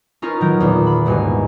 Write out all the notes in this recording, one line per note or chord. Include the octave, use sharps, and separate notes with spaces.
C#4 D#4 F4 A#4 B4 C#5
A2 D#3 F#3 A#4 G6
E2 A#2 D3
B5
G1 D#2 G#2 B2 G#5